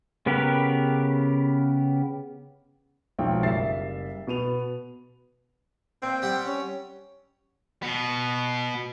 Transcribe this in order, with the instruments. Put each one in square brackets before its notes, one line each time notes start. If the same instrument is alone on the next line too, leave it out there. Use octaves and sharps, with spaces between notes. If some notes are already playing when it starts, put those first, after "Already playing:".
[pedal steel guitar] C#3 B3 G4 A#4 B4
[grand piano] B1 F2 G#3 G#4 G5
F#1 G3 E5 A6 C7
B2 B3 D#7 F7
[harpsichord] A#2 [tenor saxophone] C4
[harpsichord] G3 G4 F#5
[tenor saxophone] C#4
[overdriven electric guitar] B2 B3